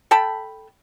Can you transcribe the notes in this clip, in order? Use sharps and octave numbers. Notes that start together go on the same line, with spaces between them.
A4 G5 A5 B5